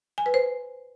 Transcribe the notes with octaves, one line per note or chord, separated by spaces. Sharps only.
G#5
B4
C5